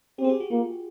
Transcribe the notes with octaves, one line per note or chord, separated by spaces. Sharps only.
C4 G4
G#4
G4
F#4
A#3 F4